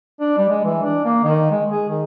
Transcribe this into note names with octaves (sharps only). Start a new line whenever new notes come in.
D4
G3
G#3
E3
D4
A#3
D#3
G#3
G#4
D#3